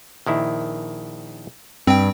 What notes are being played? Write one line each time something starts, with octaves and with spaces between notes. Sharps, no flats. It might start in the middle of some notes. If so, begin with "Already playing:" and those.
A#1 D#3 E4
G2 C4 G5